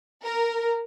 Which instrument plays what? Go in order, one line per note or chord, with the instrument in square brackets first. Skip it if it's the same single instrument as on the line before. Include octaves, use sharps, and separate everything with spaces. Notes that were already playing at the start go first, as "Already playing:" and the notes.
[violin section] A#4